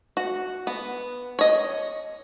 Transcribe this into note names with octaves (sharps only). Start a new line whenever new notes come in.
F#4
B3
C#5 D#5